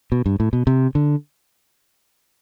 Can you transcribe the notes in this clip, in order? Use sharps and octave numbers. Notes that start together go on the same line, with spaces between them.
B2
G2
A2
B2
C3
D3